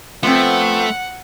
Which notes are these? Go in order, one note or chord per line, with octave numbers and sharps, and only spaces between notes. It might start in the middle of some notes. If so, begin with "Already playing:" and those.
F3 A3 B3 C4 F#5